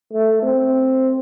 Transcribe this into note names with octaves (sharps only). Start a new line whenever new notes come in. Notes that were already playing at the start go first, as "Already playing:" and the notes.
A3
C4